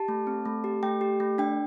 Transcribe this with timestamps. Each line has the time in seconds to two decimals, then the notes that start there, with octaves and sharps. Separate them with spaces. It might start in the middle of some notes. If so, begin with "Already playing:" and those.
Already playing: G4 A5
0.08 A3
0.27 C4
0.45 A3
0.64 G4
0.83 A3 G5
1.01 G4
1.20 A3
1.38 D4 G5